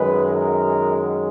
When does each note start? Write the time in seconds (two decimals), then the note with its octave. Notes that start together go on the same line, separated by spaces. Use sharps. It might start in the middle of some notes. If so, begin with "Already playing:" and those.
Already playing: F#2 D#3 G#3 B4
0.34 A#4